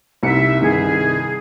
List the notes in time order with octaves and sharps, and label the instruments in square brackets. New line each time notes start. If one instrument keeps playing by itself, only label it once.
[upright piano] C2 C#7 [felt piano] C4 D#4 G4 [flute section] E5
[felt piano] G2 C3 D#3 [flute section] G#4